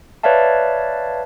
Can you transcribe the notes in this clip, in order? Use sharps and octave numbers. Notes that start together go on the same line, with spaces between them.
B4 C#5 D5 E5 F5 A5